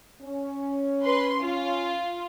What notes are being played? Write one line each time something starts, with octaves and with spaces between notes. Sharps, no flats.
C#4
B4 C6
F4